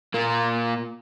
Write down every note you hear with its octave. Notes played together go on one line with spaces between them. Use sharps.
A#2 A#3